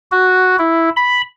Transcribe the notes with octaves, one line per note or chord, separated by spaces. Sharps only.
F#4
E4
B5